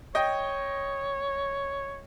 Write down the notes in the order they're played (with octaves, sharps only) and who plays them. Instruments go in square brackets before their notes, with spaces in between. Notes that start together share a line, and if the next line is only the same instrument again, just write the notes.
[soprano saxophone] C#5 [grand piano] D#5 G5